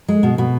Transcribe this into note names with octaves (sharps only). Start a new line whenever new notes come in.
G#3
B2
B2